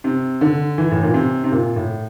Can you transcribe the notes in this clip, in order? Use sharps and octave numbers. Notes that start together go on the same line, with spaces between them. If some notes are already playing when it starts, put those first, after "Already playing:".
C3
D3
E3
A2
A#2
C3
C3
A#2
A2